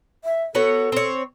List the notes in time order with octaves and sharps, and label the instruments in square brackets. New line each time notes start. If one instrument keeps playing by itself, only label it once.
[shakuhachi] E5
[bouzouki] B3 F#4 C#5 [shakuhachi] A4
[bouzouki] C4 C#5